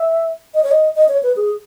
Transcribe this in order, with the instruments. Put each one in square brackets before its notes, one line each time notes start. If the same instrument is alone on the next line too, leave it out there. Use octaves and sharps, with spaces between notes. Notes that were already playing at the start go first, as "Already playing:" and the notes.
Already playing: [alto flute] E5
D#5
C#5
D#5
D#5
C#5
B4
G#4